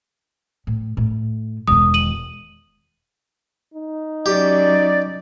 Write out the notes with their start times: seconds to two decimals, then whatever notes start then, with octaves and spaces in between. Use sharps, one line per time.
0.67 A2
0.97 A2
1.68 E1 D#3 D#6
1.94 D#7 F#7
3.74 D#4
4.26 F#3 C#4 G4 D5